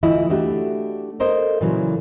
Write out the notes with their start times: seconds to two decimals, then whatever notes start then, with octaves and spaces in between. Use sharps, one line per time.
0.03 D2 E3 E4 F4 D#5
0.30 A3 D4 F#4 G4
1.20 A4 A#4 C5 D#5
1.61 A#2 C#3 E3 F#3